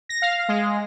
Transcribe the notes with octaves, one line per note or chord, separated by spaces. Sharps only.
A#6
F5
G#3